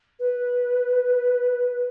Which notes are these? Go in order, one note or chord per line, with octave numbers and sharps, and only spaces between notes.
B4